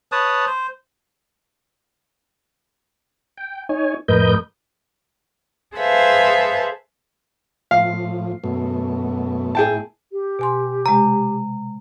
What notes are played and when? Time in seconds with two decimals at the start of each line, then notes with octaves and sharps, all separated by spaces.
0.12 B4 C#5 A5 D#6
0.47 C5
3.38 G5
3.69 D#4 C#5 G#5
4.08 F2 A2 A#4 B4 D#5 G6
5.76 G#4 A4 B4 C5 E5 F5
7.71 A2 F3 F5
8.44 F#2 B2 A3
9.55 A2 E4 G#4 G5 A5
10.12 G4
10.39 B2 G#5 C6
10.86 C3 G#3 A#5